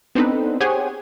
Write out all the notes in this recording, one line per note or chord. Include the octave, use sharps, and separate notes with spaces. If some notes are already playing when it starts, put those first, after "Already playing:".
B3 C4 D4 D#4 A4 B4
G4 G#4 C5 C#5 F#5 G#5